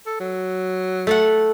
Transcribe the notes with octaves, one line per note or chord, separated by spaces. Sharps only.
A4
F#3
A3 A4 F#5